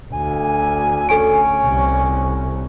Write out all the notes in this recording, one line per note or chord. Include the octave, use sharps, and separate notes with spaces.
D2 G#5
C#4 A4 G#5 D7
C2